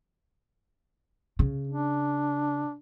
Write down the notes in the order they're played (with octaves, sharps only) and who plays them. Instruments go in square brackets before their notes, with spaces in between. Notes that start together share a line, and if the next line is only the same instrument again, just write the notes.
[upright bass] C#3
[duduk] D4